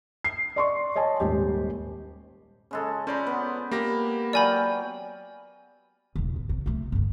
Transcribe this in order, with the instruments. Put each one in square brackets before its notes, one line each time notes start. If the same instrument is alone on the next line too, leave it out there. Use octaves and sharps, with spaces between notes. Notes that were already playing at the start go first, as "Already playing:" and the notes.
[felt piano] C7
D5 C6 C#6
C#5 D#5 G#5 A5
D#1 G#1 G4
[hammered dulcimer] C#3 G#3 A4
[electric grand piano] C#4 D5 [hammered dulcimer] C5 A#5 B5
[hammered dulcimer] B3
[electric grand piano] A#3 G4 A#6 [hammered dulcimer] B5
[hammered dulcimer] F#3 F5 G5 [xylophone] D5 G#5 B5
[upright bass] E1 C#2
G#2
C3
C3 A3
G1 D2